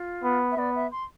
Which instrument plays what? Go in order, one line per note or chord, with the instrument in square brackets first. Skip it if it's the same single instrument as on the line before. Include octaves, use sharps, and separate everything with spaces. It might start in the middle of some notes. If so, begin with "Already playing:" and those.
Already playing: [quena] F4
[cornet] B3
[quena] E5
[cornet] B3 [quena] D5
[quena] E5
C6